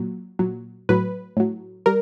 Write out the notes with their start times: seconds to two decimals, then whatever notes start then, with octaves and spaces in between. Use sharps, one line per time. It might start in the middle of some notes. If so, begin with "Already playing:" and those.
Already playing: A#2 F#3
0.39 A#2 F#3
0.89 A2 F#3 B4
1.37 A2 F#3
1.86 G3 A#4